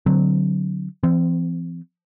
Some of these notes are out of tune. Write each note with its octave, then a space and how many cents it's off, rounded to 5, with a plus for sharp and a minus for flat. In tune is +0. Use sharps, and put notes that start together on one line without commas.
D3 +0 F#3 +0 C4 +0
E3 +40 C4 -25